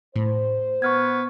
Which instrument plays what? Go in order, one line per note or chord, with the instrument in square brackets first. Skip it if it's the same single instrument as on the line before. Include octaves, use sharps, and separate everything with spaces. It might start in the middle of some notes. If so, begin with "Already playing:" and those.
[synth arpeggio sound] A2 [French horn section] C5
[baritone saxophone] B3 [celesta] C#6 F6 G#6